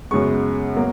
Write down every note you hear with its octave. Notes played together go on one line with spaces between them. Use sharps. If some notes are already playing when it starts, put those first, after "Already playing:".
F#2 C#3 G#3 B3 C#6
B2 F#3 A#3